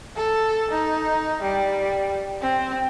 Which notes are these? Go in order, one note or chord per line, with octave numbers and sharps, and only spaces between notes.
A4
D#4
G3
C4